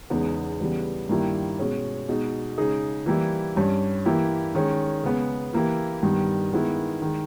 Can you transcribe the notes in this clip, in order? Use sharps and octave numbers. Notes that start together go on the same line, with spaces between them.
E2 C#3 G#3 B3 D#4
C#3 E3 G3 B3
G2 D#3 A#3 E4 G4
B2 G#3 C#4
B2 G#3 D#4
C#3 G#3 D#4 G#4
E3 G3 A#3 E4 G4
G2 G3 C#4
E3 A#3 E4 G4
D#3 G#3 C#4
C#3 G#3 B3
E3 A#3 E4 G4
G2 D#3 G3 B3
D#3 G#3 B3 E4
D#3 G#3